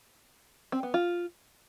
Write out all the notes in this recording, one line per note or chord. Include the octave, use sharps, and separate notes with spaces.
C4
B3
F4